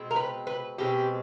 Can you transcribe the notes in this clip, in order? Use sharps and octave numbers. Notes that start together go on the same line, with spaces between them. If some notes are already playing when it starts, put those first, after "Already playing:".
Already playing: B2 G#3 C4
A#4
B4
B4
B2 G#3 C4 G4